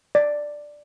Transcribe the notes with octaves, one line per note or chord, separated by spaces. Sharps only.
D5